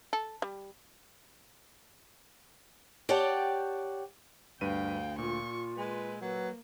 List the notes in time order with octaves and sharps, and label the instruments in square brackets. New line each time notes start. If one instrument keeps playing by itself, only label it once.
[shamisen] A4
G3
[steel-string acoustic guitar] G4 C#5 D5 F#5 G5 A5
[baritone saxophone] D2 [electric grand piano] G2 B4 D#7 [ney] F5 [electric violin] G5
[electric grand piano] A#2 [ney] F4 [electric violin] C#6
[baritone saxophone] G#3 [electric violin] B4
[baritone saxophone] F#3 [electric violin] A#3 [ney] B4